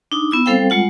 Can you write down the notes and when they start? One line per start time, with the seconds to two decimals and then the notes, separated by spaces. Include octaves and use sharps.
0.12 D4 D#4
0.31 B3 E4 E6
0.46 G3 C4 A4 C5 F5 G5
0.70 G3 G#3 F4 F#5